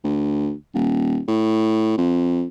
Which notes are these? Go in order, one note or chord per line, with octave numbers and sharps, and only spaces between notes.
D2
D#1
A2
F2